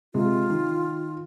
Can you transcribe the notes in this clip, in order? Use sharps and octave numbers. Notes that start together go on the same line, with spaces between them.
C3 G#3 F4
D#3